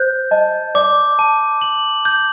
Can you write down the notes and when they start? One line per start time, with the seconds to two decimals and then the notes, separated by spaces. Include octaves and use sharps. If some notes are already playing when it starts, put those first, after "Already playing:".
Already playing: C5 G6
0.31 D#5 A5
0.75 D5 D6
1.19 A5
1.62 F#7
2.05 G6